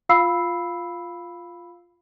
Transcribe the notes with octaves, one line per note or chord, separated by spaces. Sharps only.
F4 F5 B5 E6 C7